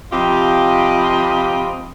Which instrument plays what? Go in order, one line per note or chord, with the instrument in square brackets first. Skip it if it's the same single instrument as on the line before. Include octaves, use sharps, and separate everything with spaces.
[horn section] C3 F3 F4 G4 D#5 B5